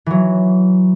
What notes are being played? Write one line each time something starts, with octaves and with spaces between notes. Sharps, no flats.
E3 F#3